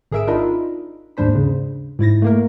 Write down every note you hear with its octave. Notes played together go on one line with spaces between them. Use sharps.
G#1 G#4 A#4 E5 E6 D7
D4 D#4 F4 A#4 D#5 B5
D#2 G#2 D4 C5 B5
C#3
G#2 E4 A6 A#6
A3 A#3 A#4